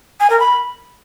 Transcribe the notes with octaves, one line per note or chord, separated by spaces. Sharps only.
G#5
A#4
B5